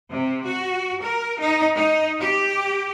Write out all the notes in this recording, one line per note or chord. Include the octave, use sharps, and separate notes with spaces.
C3
F#4
A#4
D#4
D#4
G4